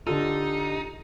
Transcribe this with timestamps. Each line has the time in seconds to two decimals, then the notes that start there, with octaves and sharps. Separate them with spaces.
0.07 D3 D#4 F4 G4 A4